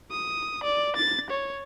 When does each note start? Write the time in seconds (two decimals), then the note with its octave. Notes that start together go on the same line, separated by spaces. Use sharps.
0.11 D#6
0.64 D5
0.96 A6
1.30 C#5